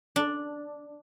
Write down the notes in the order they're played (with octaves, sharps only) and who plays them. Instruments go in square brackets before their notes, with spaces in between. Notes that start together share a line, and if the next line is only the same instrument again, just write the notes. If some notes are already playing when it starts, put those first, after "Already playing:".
[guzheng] D4